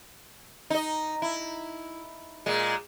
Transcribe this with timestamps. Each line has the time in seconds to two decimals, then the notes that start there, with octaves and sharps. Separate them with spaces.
0.70 D#4 D#5
1.22 E4
2.46 A#2 G#3